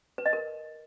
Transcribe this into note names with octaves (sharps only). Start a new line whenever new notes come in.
B4
D#5
A#4